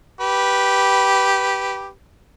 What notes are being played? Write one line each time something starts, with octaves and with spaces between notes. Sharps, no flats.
G4 B4